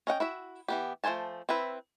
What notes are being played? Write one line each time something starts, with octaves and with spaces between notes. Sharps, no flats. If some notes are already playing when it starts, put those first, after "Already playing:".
C#4 D#5 F#5 G5
E4 F#4 E5
E3 B3 G4
F3 A3 C5 G#5 A5
C4 E4 B4